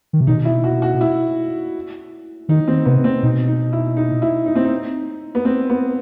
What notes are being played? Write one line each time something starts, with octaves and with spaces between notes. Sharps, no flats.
D#3
C3
B2 D#4
E4
F#4
F#4
E4
D#3 D#4
C4
C3 B3
C4
B2 D#4
D#4
E4
D#4
E4
D#4
C4
D#4
B3
C4
B3